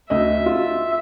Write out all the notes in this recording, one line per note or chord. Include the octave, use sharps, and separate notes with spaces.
D2 F#4 D#5 E5
F4